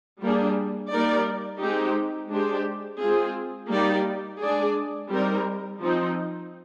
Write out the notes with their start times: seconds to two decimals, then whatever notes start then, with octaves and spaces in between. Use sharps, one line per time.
0.23 G3 A#3 D4 G#4
0.92 G3 A#3 D#4 A#4 D5
1.62 G#3 C4 D#4 G4
2.32 G#3 D4 G4 C5
3.02 G#3 C4 F4 G#4
3.72 G3 A#3 D#4 G4 D5
4.41 G#3 D4 G#4 D5
5.11 G3 C4 D#4 A#4
5.81 F3 C4 D#4